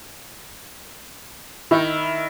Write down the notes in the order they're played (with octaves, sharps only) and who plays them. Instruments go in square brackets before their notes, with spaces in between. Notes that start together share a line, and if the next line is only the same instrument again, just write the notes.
[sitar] D#3 [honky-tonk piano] E4